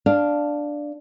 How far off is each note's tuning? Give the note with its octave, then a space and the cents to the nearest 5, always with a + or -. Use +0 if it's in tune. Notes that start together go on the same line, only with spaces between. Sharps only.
D4 +0 F5 +0